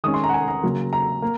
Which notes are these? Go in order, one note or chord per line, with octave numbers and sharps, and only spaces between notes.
D#3 G#3 C#4 D#6
C6
A#5
F#5
G#5
A#5
C#3 F#3 A#3
A#5
A#3